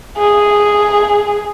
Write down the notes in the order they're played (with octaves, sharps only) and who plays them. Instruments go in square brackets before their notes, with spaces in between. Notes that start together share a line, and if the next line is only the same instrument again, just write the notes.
[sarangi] G#4